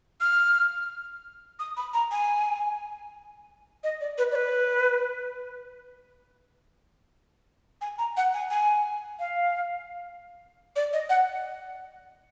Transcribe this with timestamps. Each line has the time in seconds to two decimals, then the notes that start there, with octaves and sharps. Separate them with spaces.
0.21 F6
1.59 D#6
1.77 B5
1.93 A#5
2.11 G#5
3.84 D#5
4.01 D5
4.18 B4
4.32 D5
4.36 B4
7.81 G#5
7.98 A#5
8.17 F#5
8.34 G#5
8.51 G#5
9.19 F5
10.76 D5
10.93 D#5
11.09 F#5